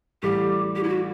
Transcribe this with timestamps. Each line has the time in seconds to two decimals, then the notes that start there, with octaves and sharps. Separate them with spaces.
0.23 A1 A2 G3 G4
0.76 G4
0.83 E4
0.89 F#4